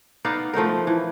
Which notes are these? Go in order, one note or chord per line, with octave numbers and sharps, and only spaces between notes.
B3 D#4 D5 F5
F3 A3 D#4 A#4
E3